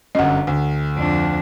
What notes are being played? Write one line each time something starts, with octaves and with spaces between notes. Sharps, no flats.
G1 F#2 D#5 F#5
D2
F2 D4